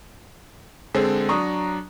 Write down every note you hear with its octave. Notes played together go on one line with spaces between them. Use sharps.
D3 G#3 C4 G#4 A4
F#3 D4 A#5 C#6 D#6